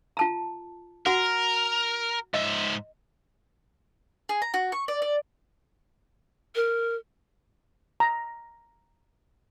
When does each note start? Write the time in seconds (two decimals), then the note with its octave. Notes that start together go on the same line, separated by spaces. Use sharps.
0.17 F4 A5 A#5
1.06 F#4 A#4 F#5
2.34 G#2 D#5 E5
4.29 G#4
4.42 A#5
4.54 F#4
4.72 C#6
4.88 D5
5.02 D5
6.55 A#4
8.00 A#5